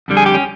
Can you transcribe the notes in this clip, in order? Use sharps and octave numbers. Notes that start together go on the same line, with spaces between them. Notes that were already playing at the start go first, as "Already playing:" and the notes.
F2 D3 G3
G#4
G4
C#4